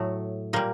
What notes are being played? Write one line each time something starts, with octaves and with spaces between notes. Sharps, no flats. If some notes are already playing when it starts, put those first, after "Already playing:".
Already playing: A2 F#3 A3
A#2 G3 A#3